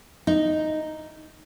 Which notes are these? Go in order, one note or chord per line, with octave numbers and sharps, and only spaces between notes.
D#4